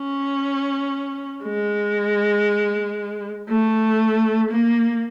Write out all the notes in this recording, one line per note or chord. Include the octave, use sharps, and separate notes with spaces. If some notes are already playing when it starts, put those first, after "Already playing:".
Already playing: C#4
G#3
A3
A#3